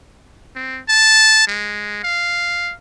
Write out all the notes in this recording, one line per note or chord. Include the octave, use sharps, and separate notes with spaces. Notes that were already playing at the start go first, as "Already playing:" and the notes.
C4
A5
G#3
F5